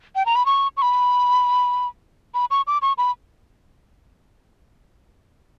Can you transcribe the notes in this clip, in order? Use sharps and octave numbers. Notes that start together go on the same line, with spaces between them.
G5
A#5
B5
C#6
C#6
B5
B5
C#6
D6
C#6
B5